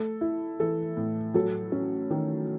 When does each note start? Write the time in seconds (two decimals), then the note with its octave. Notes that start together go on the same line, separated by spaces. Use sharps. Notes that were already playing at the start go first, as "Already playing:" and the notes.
Already playing: A3 A4
0.21 E4
0.59 E3 A4
0.97 A2
1.34 F#3 A4
1.72 C#4
2.10 D#3